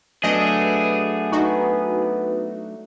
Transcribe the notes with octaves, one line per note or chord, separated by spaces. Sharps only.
F#3 A3 B3 D4 G#4 D#5
D#4 F#4